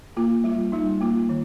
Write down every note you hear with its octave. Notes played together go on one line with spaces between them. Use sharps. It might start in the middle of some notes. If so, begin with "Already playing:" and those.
A#3 F4
G3 F4
G3 D#4
A#3 F4
D#3